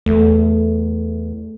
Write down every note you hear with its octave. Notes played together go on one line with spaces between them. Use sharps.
E2 A3